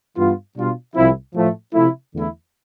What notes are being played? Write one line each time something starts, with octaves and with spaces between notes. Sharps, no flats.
G2 E3 B3 F4
B2 G3 D4 F4
C2 C3 F3 C4 E4
A2 F3 A3
C3 F3 A3 E4
E2 D3 A3 E4